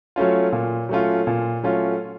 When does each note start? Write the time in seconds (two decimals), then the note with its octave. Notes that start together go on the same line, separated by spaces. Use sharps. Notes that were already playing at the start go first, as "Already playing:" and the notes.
0.16 F#3 A3 C#4 F4
0.52 A#2
0.89 F#3 A3 C#4 F4
1.27 A#2
1.63 F#3 A3 C#4 F4